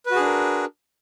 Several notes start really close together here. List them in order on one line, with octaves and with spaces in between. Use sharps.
B4 F#4 G#4 D4 A#4